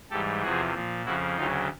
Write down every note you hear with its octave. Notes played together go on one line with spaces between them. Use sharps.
G#2 E3 G3 G4 A4
E2 C3 F3 F#4 G#4
A#2 F3
F2 C#3 F3 E4 F#4
D2 C#3 F#3 D#4 F4